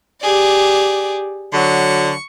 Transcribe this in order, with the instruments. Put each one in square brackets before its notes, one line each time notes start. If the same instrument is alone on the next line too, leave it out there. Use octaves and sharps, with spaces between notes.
[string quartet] G4 G#4 D5
[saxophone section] D3 F#3 [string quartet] C#6